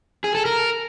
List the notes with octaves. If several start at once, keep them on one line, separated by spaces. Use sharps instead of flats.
G#4
A4
A#4